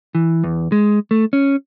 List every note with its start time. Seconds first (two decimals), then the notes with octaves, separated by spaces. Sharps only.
0.15 E3
0.44 E2
0.72 G#3
1.11 A3
1.33 C#4